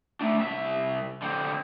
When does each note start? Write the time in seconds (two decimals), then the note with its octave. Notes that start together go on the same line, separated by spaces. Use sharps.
0.21 A3 D4
0.39 C2 E5
1.22 D3 C4